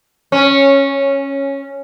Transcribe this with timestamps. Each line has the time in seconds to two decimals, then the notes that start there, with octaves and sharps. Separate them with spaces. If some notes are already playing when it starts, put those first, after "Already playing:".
0.32 C#4